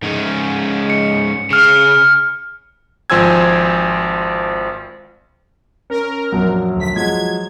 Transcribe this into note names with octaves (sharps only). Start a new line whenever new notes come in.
G#2 C#4
C#7
C#3 F6 C#7
G#1 F3 C5 G#5 E6 G#6
C#4 A#4
A#1 F#2 F#3
D2 B6
F3 F#3 G#3 G#6